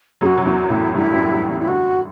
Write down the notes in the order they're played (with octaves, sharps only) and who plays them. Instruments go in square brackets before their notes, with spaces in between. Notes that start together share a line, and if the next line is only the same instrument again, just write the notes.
[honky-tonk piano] F#2 F#3 [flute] G#4
[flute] F#4
[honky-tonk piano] F#3
[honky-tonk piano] E2 E3 [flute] F#4
[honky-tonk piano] A2 A3 [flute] E4
[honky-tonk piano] G2 G3 [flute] E4
[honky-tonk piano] F#2 F#3
F#2 F#3
E2 E3
[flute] E4
[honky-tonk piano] D3 [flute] F#4